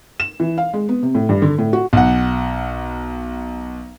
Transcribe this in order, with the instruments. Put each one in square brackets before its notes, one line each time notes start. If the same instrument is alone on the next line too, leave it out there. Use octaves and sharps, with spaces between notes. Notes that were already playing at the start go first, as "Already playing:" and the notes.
[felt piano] E7
E3
F5
G#3
B3
C3
A2
G2
D3
A2
F#4
[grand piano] B1 F#5